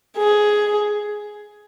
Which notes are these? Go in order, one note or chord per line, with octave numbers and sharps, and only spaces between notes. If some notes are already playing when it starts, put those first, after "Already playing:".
G#4